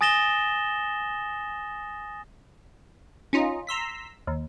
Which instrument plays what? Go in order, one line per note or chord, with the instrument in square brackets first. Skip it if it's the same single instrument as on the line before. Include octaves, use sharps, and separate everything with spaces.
[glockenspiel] G#5 D#6 A6 A#6 E7 G7
[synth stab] C#4 D#4 F4 D#5
A#5 C6 E6 B6
D#2